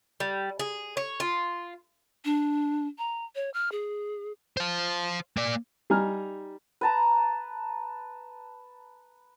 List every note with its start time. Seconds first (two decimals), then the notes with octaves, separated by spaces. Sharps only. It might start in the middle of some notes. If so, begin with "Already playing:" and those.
0.20 G3
0.59 G#4
0.97 C#5
1.20 F4
2.25 D4
2.98 A#5
3.36 C#5
3.54 F6
3.72 G#4
4.57 C5 F5
5.37 A#3 D5
5.90 G3 D#4 G#5 A#5 F6
6.81 B4 A5 A#5